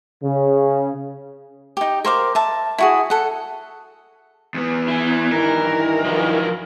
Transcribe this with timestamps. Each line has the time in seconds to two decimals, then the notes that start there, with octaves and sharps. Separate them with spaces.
0.23 C#3
1.77 D#4 G4
2.05 A#4 C5 F5 D6
2.35 E5 A5
2.78 E4 F#4 G#4
3.10 A4 F#5
4.54 E2 B3
4.88 E4 G#5
5.32 G2 D#3 E3 A#4
6.04 F3 F#3